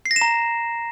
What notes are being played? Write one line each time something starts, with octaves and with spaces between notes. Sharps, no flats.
C7
A#6
E7
A#5